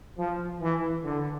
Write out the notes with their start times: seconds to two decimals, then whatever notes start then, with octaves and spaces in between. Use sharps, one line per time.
0.18 F3
0.61 E3
1.04 D3